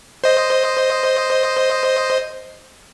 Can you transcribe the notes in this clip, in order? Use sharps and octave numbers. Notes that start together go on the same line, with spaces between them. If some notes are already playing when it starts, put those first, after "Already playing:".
C5 D#5